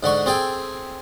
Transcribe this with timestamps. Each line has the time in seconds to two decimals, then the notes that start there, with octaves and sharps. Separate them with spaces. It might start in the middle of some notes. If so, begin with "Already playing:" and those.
0.03 G#2 D3 F#5 C#6
0.26 C4 G#4 A4 G5 G#5